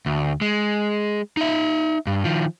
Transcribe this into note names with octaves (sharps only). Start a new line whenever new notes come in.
D2
G#3
D#4 E5
G2
D#3 F3